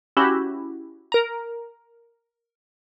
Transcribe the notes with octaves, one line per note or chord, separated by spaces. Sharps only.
C#4 E4 F#4 G4
A#4 A#5